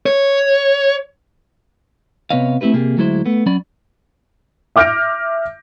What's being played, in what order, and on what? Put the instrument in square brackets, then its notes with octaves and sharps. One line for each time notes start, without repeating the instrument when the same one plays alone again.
[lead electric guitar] C#5
[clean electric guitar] C3 B3 B4 C#5 D#5 F5
A3 C4 E4 G4 B4
C3 A#3 G4 G#4
D2 F#3 G#3 E4 B4 C5
A3 B3
F#3 C#4 D5 B5
[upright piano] E5 D6 F6 G6 A#6 D7